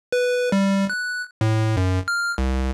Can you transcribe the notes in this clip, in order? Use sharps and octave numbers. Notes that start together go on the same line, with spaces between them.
B4
G3
F#6
A2
F#2
F6
C2